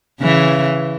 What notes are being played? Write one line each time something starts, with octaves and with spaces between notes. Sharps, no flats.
C#3 E3